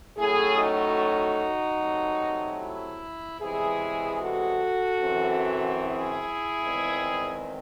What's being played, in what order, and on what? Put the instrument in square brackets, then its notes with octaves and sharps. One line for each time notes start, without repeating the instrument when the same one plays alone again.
[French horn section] A2 F#3 A3 C#4 E4 G#4
D#4 F#4
C3 F#3 A3
E4
E2 C3 E3 G#3 E4 G#4
F#4 A4
F#2 E3 C4
E4 G#4
E2 D#3 G#3 C4